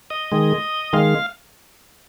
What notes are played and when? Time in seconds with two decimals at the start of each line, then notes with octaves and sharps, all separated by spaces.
0.10 D#5
0.32 D#3 G#3
0.93 D#3 G#3 F5